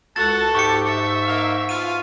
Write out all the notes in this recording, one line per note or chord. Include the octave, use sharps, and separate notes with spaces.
C#2 F#4 A4 F#5 A5 A6
G#2 G4 E5 C#6 C#7
E5
A#3 D#4 F5
B2 E4 F4 D#7